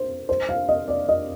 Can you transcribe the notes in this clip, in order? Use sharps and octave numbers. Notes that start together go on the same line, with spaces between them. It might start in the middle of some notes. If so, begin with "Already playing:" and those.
Already playing: C5
C5
F5
D#5
D5
D#5